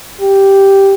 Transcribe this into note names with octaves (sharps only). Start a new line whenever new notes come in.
G4